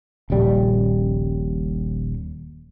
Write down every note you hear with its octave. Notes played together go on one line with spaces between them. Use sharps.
D#1 A#1 C#3 G3